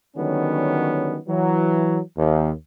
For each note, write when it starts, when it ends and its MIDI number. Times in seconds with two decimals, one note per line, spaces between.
0.16 1.17 50
0.16 1.17 51
0.16 1.17 54
0.16 1.17 55
0.16 1.17 59
0.16 1.17 61
1.28 1.99 52
1.28 1.99 54
2.17 2.50 39